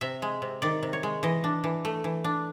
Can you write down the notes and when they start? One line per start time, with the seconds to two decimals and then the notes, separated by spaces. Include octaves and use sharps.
0.01 C3 E5
0.22 G#3
0.42 C3
0.62 D#3 D5
0.83 C3
0.93 C#5
1.03 G#3
1.23 E3 D#5
1.44 D4
1.64 E3
1.85 A3
2.04 E3
2.24 D4